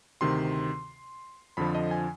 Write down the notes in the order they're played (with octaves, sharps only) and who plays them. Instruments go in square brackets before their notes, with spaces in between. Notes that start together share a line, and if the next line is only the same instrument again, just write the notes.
[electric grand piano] D2 C3 D#3 C6
F2 D3 F3 B5
D#5
G#5